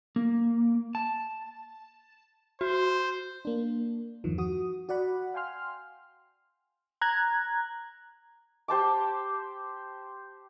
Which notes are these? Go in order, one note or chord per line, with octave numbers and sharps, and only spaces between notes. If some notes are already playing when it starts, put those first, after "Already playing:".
A#3
A5
F#4 C5
A#3 D4
E2 G2 D#3 F3
F#4 D#6
F#4 D5 F#5 B5
F5 G5 G#5 C6 F6
A#5 F#6 G#6
G4 C5 A5 D6